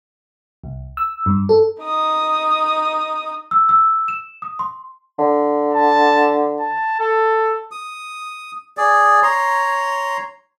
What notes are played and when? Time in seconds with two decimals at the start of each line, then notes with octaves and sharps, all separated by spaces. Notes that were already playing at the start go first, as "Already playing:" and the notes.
0.64 C2
0.97 E6
1.26 G2
1.49 A4
1.81 D#4 D#6
3.51 E6
3.69 E6
4.08 E7
4.42 D#6
4.59 C6
5.18 D3
5.74 A5
6.60 A5
7.00 A4
7.71 D#6
8.77 G#4 D5
9.23 C#5 A#5 C6